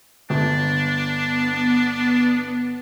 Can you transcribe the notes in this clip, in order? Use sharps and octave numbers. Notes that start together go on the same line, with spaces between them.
G1 D4
B3